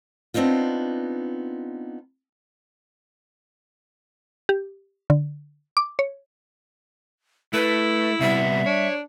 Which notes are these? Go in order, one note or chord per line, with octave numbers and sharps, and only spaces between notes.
B3 C4 D4 D#4 F4
G4
D3
D6
C#5
A3 E4 B4
C3 G3 B3 E5
D4 C#5